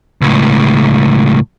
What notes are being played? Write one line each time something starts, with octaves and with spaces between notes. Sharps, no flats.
C#2 A2